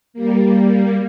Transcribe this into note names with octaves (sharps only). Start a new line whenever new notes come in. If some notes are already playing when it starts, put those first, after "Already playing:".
G3 A#3